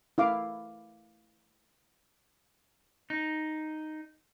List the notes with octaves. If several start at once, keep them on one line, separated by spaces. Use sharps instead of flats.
E4 F5 D6
D#4